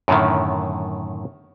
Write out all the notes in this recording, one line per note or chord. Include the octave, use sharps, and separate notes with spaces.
F#2 A2 D3 D#3